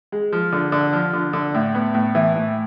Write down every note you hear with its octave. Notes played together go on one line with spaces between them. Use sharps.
G#3
F3
D3
D3
F3
D3
D3
A2
B3
A2
E3
A2